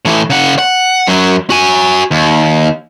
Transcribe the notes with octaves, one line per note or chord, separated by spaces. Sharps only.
A2 E3
C#3 F#5
F#5
F#2 F#3
F#4 G#5
D#2